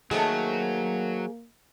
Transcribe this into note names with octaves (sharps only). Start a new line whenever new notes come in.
D#3 F#3 A3 A#3 G#4 C5